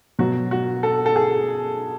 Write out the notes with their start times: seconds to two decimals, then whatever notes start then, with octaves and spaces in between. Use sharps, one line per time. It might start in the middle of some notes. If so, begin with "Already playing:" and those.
0.19 B2 F#3 F#4
0.51 F#4
0.83 A4
1.06 A4
1.16 G#4